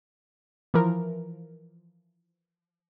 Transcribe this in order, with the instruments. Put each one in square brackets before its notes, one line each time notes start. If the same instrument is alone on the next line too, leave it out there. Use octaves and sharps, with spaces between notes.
[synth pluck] E3 F3 A#4